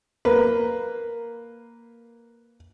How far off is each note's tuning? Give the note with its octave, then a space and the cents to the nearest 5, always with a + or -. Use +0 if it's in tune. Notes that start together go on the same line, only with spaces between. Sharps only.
A#3 +0 B4 +0